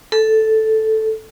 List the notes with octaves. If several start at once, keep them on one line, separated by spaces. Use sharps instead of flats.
A4